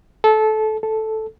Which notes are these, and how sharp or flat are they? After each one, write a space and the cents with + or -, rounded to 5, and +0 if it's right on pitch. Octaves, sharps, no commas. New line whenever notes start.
A4 -20
A4 -5